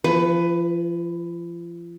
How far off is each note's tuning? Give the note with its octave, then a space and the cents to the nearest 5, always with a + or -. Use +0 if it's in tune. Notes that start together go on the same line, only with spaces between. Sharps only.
F3 -35 B4 +15